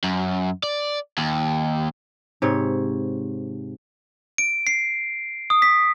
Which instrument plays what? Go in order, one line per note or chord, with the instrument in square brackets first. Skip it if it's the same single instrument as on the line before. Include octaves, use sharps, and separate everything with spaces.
[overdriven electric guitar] F#2
D5
D#2
[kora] G#2 C3 C#5
[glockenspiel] D7
C7
D#6
B6